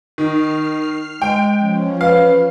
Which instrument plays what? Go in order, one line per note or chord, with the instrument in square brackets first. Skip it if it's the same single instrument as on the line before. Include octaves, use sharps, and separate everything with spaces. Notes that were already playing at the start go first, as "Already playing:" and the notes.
[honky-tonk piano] D#3 [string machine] F6 C7
[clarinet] G#3 [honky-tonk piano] G5
[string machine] F3 C#4
[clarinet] B4 [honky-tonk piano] F5